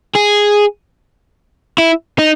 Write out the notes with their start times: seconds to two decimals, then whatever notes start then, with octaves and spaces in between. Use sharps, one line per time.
0.16 G#4
1.78 E4
2.19 D#4